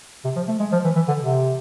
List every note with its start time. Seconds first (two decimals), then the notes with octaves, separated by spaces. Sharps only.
0.25 C3
0.36 F3
0.48 A3
0.60 G#3
0.72 F3
0.84 E3
0.96 E3
1.08 D3
1.21 C3